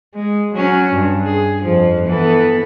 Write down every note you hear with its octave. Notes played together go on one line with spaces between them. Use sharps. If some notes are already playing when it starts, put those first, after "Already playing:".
G#3
F#3 C#4
G2
G#4
F2 F3
E3 B3 A4